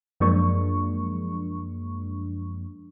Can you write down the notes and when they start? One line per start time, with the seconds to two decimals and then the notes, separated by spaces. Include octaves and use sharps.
0.20 F#2 F3 G#3 A#3 D4 C#6